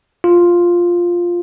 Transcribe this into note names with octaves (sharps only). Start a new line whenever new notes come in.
F4